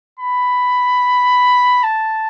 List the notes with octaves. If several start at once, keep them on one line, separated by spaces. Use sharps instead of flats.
B5
A5